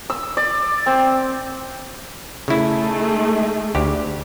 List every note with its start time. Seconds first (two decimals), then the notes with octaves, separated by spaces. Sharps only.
0.10 E6
0.37 D5
0.86 C4
2.48 C#3 A3 D#4 E4 G#4
3.75 D2 G4